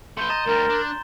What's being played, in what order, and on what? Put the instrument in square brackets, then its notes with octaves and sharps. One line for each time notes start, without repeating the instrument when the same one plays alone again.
[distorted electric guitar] A3 B4 [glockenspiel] C6 G6 G7
[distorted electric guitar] D#5 [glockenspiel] A#5 A6 E7
[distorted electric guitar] D2 G3 [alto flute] A#4
[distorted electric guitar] D4